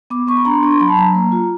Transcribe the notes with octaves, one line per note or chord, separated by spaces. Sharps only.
B3 D6
B3 C#6
B5
D4 A#5
C6
D4 C#6
C6
F#3 B5
A5
F#3 A#5
A#3
F4